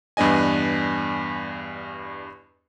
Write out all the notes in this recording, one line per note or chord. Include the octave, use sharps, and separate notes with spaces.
E2 G2 B3 D4 D#5 G#5